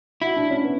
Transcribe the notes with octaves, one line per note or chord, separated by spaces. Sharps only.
E4 F#4
D4
C#4
B3